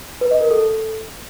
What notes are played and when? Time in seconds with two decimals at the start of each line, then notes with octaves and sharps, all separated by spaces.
0.21 B4
0.31 D#5
0.41 A#4
0.51 A4